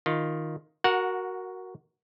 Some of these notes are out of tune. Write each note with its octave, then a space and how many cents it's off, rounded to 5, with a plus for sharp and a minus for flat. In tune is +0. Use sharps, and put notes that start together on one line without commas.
D#3 +0 F4 +0
F#4 +0 A#4 +0 F#5 -20